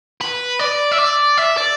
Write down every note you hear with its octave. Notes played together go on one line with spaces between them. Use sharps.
B4
D5
E5
D5
E5
D5